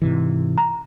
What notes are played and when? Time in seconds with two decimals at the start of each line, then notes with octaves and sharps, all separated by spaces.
0.02 G#2 C3 E3
0.58 A#5